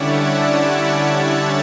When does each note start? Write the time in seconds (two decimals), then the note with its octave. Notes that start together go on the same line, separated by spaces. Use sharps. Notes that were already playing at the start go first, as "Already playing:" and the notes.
Already playing: D3 G3 C#4 E4 C#5 D5 E5 F#5
0.11 F#5 A5